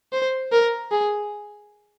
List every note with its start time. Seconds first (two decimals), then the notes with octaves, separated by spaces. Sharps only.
0.12 C5
0.52 A#4
0.91 G#4